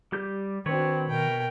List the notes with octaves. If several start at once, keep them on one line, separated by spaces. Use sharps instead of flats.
G3 G4 G6
D#3 C4 D4 F#4 B4 C#5
B2 A#4 G5